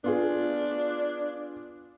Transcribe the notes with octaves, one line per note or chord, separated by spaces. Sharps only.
B3 D4 F4 G#4